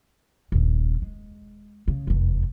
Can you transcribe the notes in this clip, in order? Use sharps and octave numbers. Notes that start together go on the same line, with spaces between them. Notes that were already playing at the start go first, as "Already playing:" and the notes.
D#1 A#1
G#3
C#3
F1 E2